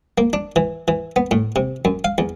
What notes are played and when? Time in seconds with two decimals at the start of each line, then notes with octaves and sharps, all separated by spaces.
0.18 A#3
0.33 D4
0.56 E3
0.88 E3
1.16 B3
1.31 A2
1.56 C3
1.85 F#2
2.05 F5
2.18 E2